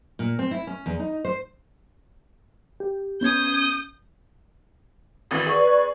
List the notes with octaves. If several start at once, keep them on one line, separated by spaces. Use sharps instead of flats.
A#2
C4
E4
C#4
E2
D#4
C5
G4
B3 C#4 D#6 G6 G#6
G#1 E3
G#4 B4 D5 C#6